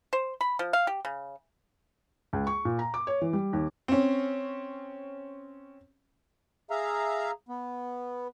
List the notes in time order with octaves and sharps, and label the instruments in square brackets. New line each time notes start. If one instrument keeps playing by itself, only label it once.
[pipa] C5
B5
F3
F5
G4
C#3
[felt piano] C#2
C#6
A#2
A#5
D6
C#5
E3
G3
D#2
[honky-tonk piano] C4 C#4
[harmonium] G#4 E5 F5 A#5
B3